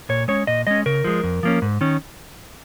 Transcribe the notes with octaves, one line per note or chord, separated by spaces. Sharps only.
A#2 C#5
G#3 C#4 C#5
A#2 D#5
G#3 C#4 D#5
C#3 A#4
F3 G#3
F2
F3 A#3 C#4
G#2
D#3 C#4